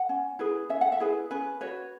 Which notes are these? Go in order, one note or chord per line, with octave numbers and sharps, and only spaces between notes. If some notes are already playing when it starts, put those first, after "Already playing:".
Already playing: F#5
C#4
E4 G#4 B4
C#4 E5
F#5
E5
E4 G#4 B4
C#4 B4
F#4 B4 C#5